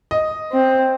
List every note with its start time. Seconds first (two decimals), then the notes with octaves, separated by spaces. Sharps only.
0.11 D#5
0.52 C4 C5